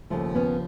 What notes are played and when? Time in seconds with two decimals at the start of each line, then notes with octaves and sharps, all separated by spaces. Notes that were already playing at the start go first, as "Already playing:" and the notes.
0.10 D#2 C#3 F3 A3
0.35 B3 C#4